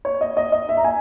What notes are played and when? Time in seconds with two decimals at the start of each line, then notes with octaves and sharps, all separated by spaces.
0.05 C#5
0.21 D#5
0.37 D#5
0.52 D#5
0.69 E5
0.77 A#5
0.84 G#5